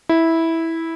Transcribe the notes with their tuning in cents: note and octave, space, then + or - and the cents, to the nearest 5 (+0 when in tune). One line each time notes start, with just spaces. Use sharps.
E4 -10